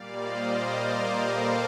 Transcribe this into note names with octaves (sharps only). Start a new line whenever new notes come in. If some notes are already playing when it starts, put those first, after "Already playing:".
Already playing: A#2 G3 A#3 D5 F5
C5 D#5
A#4 D5
A4 C5